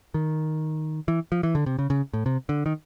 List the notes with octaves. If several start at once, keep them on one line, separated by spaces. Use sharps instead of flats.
D#3
E3
F3
E3
D3
C3
C#3
C#3
A2
C3
D3
D#3